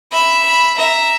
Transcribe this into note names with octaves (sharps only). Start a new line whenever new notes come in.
E5 B5
B5
E5 A#5